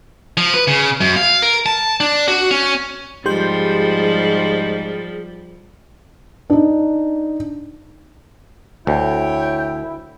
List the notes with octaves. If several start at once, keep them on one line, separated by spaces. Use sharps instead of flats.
F3
B4
C#3
F#2
F5
A#4
A5
D4
F#4
C#4
G#2 F3 G3 G4 G#4 C6 G6
D4 D#4
D2 E4 C#5 G5